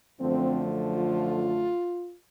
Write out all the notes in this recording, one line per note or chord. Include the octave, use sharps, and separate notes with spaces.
F#2 D3 F3 A3 C4
F4